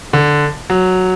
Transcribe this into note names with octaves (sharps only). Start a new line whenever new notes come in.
D3
F#3